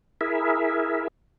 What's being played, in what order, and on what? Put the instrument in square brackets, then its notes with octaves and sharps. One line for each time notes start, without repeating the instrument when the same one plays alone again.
[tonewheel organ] E4 G#4 A#4 E5